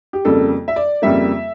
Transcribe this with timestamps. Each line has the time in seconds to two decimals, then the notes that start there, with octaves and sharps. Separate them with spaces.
0.13 G4
0.25 F2 C#3 G3 A#3 A4
0.68 E5
0.76 D5
1.02 F2 C#3 G3 A#3 E5